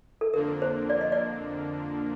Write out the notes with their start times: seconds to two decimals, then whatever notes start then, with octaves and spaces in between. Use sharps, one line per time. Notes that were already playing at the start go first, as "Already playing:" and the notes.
0.21 A4
0.33 F2 D3 F3 A#3 D4 A#4
0.62 C5
0.90 D5
1.01 D#5
1.12 D5